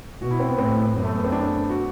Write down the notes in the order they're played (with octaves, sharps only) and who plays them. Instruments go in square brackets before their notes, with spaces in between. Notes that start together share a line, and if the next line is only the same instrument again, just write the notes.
[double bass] B2 [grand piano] F#4
[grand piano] E4
C4
B3
[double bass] A2 [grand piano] C4
[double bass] F#2 [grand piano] B3
[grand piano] A3
B3
C4
D4
F#4